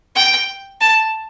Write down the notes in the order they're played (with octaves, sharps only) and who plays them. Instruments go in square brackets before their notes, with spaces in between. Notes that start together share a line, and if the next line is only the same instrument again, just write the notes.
[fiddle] G5
A5